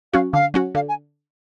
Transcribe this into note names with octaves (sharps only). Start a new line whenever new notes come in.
F#3 C#4 F#4 F5
D3 F5
F#3 C#4 F#4
D3 F5
G#5